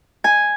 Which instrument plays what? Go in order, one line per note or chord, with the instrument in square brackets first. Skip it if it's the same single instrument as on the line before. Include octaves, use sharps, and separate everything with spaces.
[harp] G#5